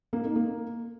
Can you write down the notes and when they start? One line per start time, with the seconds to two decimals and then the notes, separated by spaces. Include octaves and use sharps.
0.13 A#3
0.24 D#4
0.36 A#3